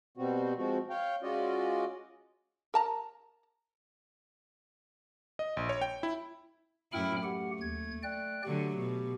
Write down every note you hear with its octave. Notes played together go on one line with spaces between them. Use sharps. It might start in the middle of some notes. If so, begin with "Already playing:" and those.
B2 G3 C4 F#4
F3 G#3 C4 F#4
C#5 F5 G5
G#3 C#4 F4 F#4 D5 D#5
A#4 A5 A#5
D#5
A#1
C#5
G5
E4
F#2 A2 E4 G5 B5 F6
A3 G4 F#5
D#2 G#6
D5 G5 F#6
D3 F#3 A3 G4
B2